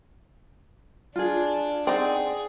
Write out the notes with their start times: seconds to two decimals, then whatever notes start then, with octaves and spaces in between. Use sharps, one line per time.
1.16 D4 F4 G#4
1.87 C4 D#4 G#4 D5 F#5